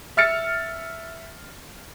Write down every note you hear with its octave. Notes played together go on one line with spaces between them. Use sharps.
E5 F6 A6 C#7